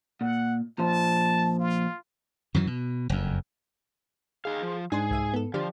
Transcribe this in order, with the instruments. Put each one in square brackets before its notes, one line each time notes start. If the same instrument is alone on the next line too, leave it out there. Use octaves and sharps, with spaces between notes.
[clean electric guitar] A#2 [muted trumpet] F#5
[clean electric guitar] A#2 F3 C5 [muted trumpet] A5
[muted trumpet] F4
[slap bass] F#2 D#3 E3 F#3
B2
F#1 F2
[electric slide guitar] D#4 F5 [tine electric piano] G#4
[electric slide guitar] F3
[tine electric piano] G#2 [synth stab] D4 C5 [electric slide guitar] G#4
[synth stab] C2 E5 D#7
B3 A4
[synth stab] D3 G4 D5 [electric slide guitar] F3